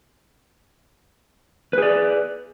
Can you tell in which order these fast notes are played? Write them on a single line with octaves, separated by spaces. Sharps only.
B4 G#4 D5